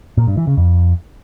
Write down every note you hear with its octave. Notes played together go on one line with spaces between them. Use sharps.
A#2
G2
E3
C#3
F2